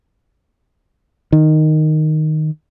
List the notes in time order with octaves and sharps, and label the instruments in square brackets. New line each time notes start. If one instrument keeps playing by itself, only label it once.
[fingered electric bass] D#3